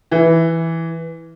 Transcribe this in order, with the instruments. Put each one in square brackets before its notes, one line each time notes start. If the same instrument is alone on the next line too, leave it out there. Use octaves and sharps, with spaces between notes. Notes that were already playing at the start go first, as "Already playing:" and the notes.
[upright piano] E3